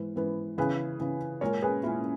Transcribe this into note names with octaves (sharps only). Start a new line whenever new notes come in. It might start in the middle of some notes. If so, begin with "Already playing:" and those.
Already playing: G#2 E3 B3
G#2 E3 B3
C#3 E3 B3 G#4 B4
C#3 E3 B3
A#2 G#3 C#4 A#4 C#5
G#4 B4
A#2 G#3 C#4 E4